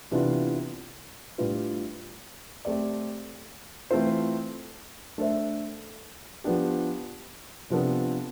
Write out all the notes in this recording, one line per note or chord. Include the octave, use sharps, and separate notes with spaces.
C3 E3 B3 D4 F4
A2 G3 D4 F4 B4
A3 C4 G4 D5
E3 A3 C4 F4 C5
A3 D4 A4 C5 E5
F3 B3 D4 G4
C3 F3 B3 D4 A4